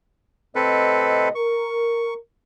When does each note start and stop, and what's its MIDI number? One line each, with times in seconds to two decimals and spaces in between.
0.56 1.31 45
0.56 1.31 48
0.56 1.29 60
0.56 1.29 69
0.56 1.29 71
0.56 1.31 75
1.35 2.14 70
1.35 2.14 85